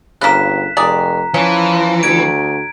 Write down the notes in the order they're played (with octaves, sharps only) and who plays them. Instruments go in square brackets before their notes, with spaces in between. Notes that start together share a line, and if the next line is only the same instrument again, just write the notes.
[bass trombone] G1 [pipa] C#3 A#3 [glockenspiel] F#6 B6 E7
[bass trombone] F1 [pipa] G#4 D5 [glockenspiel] A#5
[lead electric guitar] E3 [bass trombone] F3 [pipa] C#4
[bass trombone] D2 [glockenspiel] G#6 D7